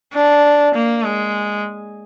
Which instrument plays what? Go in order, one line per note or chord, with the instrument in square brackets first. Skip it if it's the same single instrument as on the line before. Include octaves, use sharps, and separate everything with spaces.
[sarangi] D4
A#3
G#3